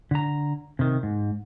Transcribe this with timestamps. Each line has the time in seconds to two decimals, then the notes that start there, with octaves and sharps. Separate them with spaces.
0.11 D3 A#5
0.79 C3 D#3
1.03 G#2